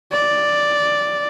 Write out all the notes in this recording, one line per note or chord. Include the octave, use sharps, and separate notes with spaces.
D5